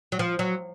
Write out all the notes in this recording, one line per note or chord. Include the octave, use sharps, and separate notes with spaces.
F#3
F3
F#3